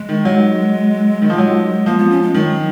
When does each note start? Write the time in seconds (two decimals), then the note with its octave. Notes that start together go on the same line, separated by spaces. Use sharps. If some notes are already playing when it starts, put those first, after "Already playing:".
Already playing: G#3
0.09 D#3
0.25 F#3
1.22 D#3
1.30 F3
1.38 F#3
1.86 F3 A#3
1.98 B3
2.10 C#4
2.22 G#3
2.34 D#3 F#3